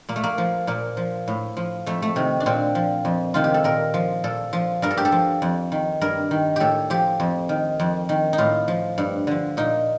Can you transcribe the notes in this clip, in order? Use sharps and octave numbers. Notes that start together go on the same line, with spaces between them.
A#2 A#3
A3
A#3
F3
A#2 A#3
F3
A2
F3
F2 A3
A3
C3 D#3
D4
A#2 C4
F3
F2
C3 D#3 F4
G4
A4
A#2 A#4
F3
A#2 A4
F3
G2 A#4
A4
G4
A4
F3
F2
D#3
G2 A#4
D#3
A2 G4 A4
F3 G4
F2
D#3
F2
D#3
D#4
A2 F4
F3
G2
D3 F3
A#2 D#4